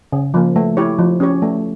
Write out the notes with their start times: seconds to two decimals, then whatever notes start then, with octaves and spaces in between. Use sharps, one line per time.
0.12 C#3
0.34 F3 A#3
0.56 A3
0.77 E4 G4 C#5
0.98 F3
1.20 C#4 G4 C#5
1.42 A3